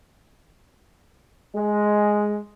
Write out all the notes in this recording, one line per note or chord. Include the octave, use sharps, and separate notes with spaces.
G#3